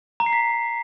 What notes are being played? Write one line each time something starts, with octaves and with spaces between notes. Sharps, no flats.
A#5
C7
B6